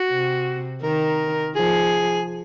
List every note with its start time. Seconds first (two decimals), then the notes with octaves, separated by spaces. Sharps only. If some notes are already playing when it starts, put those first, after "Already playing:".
Already playing: F#4
0.10 C3
0.83 D#3 A#4
1.56 F3 G#4